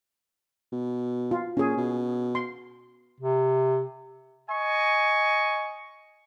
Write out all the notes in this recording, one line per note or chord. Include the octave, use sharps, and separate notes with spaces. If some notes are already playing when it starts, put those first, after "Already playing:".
B2
F4
A#2 C#4 G#4
B2
C6
C3
D#5 G#5 C#6